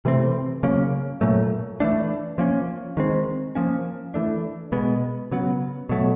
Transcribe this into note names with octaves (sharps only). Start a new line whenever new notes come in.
C3 E3 A3 C4
C#3 F#3 A#3 C#4
A#2 F#3 A3
E3 A3 D4
F3 A#3 C#4
D#3 G#3 C4
F3 A#3 C#4
E3 A3 D4
B2 G#3 B3
C#3 F#3 B3
B2 F#3 A3